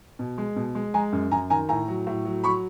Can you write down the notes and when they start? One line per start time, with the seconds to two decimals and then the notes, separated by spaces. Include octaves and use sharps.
0.19 B2
0.38 G#3
0.56 B2
0.75 G#3
0.94 G#3 G#5 A#5
1.12 F#2
1.31 F#2 G#5 A#5
1.50 D#3 G#5 A#5
1.69 A2 G#5 A#5
1.88 F#3
2.07 A2
2.25 F#3
2.44 F#3 B5 C#6